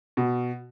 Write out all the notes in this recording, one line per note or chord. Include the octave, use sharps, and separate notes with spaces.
B2